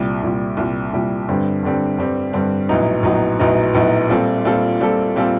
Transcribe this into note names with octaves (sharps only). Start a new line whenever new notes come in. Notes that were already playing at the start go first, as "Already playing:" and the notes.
Already playing: C2 A#2 G3
C2 A#2 G3
C2 A#2 G3
C2 A#2 G3
G2 D3 G3 C4
G2 D3 G3 C4
G2 D3 G3 C4
G2 D3 G3 C4
A#1 A2 F#3 B3 D#4
A#1 A2 F#3 B3 D#4
A#1 A2 F#3 B3 D#4
A#1 A2 F#3 B3 D#4
A#2 G3 C4 F4 A4
A#2 G3 C4 F4 A4
A#2 G3 C4 F4 A4
A#2 G3 C4 F4 A4